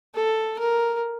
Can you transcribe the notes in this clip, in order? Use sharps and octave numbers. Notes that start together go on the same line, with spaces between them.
A4
A#4